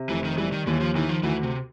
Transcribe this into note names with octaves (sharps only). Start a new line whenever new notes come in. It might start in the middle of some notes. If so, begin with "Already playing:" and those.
Already playing: C3
F1 E3
D#3
E3 G3
D#3
D#2 E3
F3
D#3 E3
F3
D2 E3
C3